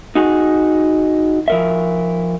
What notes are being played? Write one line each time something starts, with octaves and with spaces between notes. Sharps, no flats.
D#4 F#4 G#4
F3 A#4 E5